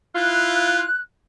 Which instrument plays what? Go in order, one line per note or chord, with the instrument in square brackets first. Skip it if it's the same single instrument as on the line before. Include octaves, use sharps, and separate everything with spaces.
[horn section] E4 F4 [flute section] F#6